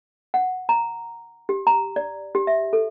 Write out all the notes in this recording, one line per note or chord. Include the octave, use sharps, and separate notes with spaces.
F#5
A#5
G4
A#5
D5
G4
E5
A4